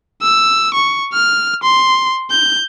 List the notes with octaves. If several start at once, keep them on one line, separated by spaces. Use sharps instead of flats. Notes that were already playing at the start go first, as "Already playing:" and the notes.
E6
C#6
F6
C6
G6